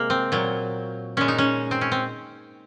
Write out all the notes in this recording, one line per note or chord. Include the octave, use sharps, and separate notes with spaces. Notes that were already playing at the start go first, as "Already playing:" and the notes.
Already playing: C3 G#3 A#3
C4
A#2 F#3
A#2 G#3 C#4
D#4
C#4
C4
C#4
C4